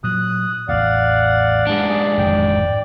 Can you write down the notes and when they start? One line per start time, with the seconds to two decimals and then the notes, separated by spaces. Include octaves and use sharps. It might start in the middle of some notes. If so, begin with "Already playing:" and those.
0.04 A#2 F#3 D#6 F#6
0.68 A1 E2 D5 F5 F#5
1.67 G#2 D4 F#5
1.89 G#4
2.18 D1 G#1 F2 G5